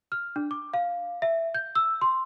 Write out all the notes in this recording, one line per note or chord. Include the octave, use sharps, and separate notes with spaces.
F6
D4
D6
F5
E5
G6
E6
C6